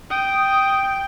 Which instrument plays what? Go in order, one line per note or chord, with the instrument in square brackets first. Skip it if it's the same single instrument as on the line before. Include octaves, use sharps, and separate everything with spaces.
[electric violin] G5 [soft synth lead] D#6